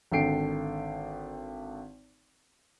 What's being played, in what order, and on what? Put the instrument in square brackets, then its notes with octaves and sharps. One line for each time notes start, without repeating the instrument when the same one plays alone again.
[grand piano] G#1 D3 A4 G5 C7 D7